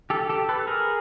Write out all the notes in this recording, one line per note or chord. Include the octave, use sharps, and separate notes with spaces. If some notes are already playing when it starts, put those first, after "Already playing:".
G4 A4
G4 A4
A4 B4
G#4 A#4